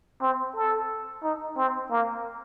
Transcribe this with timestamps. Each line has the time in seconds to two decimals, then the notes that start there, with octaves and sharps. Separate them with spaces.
0.22 C4
0.56 A4
1.23 D#4
1.57 C4
1.91 A#3